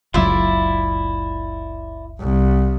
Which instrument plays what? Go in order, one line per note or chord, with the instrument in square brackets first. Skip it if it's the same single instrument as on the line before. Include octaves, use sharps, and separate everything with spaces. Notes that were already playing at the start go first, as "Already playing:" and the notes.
[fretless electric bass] F#1 C#2 F#3 [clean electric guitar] E4 [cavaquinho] F4 D5 E5
[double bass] C2